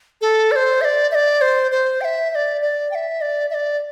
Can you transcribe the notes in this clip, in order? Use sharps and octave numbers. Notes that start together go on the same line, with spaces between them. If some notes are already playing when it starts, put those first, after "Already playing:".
A4
D5
C5
E5
D5
E5
D5
C5
C5
G5
E5
E5
D5
D5
G5
E5
D5
E5
D5